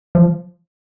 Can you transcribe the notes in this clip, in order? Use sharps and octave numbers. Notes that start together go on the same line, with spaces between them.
F3